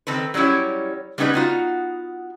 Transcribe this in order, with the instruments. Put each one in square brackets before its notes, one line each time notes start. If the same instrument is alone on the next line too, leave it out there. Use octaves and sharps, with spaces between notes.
[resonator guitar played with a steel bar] D#3 C4 A4 B4
F#3 G3 C#4 E4 C#5
G3 B3 C#4 D#4 A#4 B4
B3 D#4 F4 F#4